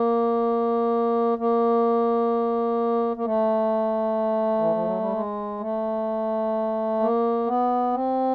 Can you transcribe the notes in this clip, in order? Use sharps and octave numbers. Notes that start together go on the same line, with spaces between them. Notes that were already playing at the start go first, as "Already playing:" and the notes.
Already playing: A#3
A#3
A#3
A3
E3
F3
F#3
G3
G#3
A3
A#3
B3
C4